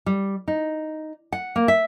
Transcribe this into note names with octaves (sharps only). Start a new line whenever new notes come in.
G3
D#4
F#5
A#3
E5